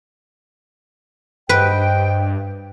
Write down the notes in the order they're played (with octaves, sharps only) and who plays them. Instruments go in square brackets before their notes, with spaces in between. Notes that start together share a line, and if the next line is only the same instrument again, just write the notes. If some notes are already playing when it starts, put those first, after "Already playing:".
[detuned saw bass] G2 [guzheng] B4 [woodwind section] C5 D#5 G5